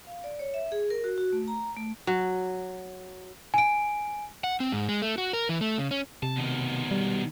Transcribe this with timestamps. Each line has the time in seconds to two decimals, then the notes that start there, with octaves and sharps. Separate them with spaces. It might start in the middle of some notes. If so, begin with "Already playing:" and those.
0.07 F5
0.24 D5
0.39 C#5
0.54 E5
0.72 G#4
0.90 A#4
1.04 F#4
1.18 F#4
1.33 A3
1.48 A#5
1.76 A3
2.07 F#3
3.54 G#5 D7
4.44 F#5
4.60 C4
4.72 G#2
4.89 G#3
5.02 A3
5.18 F#4
5.33 A#4
5.49 E3
5.61 A3
5.78 C#3
5.91 C#4
6.23 C3 A5
6.36 B2 D#3
6.91 G3